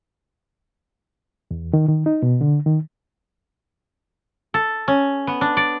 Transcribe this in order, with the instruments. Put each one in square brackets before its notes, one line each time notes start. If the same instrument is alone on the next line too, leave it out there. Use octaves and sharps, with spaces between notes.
[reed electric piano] E2
D#3
D#3
D#4
B2
D3
D#3
[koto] A4
C#4
B3
D4
D5